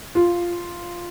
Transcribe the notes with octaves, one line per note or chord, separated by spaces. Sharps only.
F4